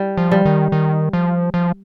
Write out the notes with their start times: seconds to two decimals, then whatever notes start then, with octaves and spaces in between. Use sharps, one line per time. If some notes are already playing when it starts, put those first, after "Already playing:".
Already playing: G3
0.17 F3
0.32 G3
0.45 D#3
0.72 D#3
1.13 F3
1.54 F3